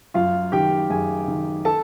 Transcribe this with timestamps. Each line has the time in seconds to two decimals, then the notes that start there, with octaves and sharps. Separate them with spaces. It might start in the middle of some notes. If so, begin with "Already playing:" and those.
0.14 F#2 F4 F5
0.52 D#3 G4 G5
0.90 F#2 G#4 G#5
1.28 D#3
1.65 A4 A5